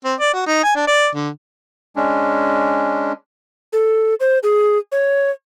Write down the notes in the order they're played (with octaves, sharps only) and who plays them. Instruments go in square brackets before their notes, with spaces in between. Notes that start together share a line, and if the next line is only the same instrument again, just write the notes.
[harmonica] C4
D5
F#4
D#4
G#5
D4
D5
D3
[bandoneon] G#3 C#4 D4
[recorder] A4
C5
G#4
C#5